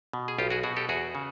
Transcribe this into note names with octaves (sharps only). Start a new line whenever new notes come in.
B2
G#4
B1 F4 G4
F#4 G#4
B2 F#4 G#4
G4 A4
E2 F#4 G#4
C#3